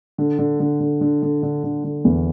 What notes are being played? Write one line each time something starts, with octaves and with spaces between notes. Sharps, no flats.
D3
D3
D3
D3
D3
D3
D3
D3
D3
E2